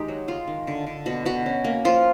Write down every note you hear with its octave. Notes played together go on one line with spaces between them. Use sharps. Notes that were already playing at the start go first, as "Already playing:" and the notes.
Already playing: D#3 G#3 D#4 G4
F#3
G#3 F4
D#3
D3
D3
B2 F#4
B2 F#4
C#4
A#3
F3 F4